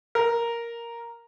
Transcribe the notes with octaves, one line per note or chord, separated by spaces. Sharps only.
A#4